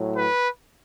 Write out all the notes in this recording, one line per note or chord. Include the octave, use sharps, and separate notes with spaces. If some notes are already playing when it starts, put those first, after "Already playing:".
Already playing: A2 F#3
B4